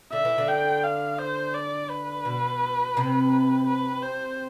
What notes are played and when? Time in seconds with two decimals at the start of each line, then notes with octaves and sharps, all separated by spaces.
0.13 D3 E5
0.25 E3
0.38 D3
0.48 G5
0.83 F5
1.18 C5
1.55 D5
1.90 B4
2.25 B2
2.97 C3
3.67 B4
4.02 C5